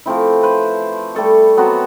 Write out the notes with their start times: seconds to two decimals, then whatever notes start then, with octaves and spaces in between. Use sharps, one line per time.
0.06 F3 A3 C4 E4
0.43 B4 C5
1.15 G3 A3 A4 C#6
1.57 F#3 B3 C4 F#4